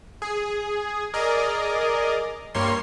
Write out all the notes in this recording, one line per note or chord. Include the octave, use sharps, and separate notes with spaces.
G#4
G#4 A#4 D5 D#5
G2 G3 A#3 C#5 C6 C7